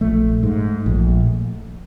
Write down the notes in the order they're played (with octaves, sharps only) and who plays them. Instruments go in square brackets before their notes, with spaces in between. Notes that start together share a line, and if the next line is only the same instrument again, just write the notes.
[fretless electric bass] A#1 A3
G#2
A#1